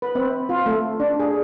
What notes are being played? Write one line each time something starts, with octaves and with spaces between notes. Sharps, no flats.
B4
C4
F4
A3
D4
G#4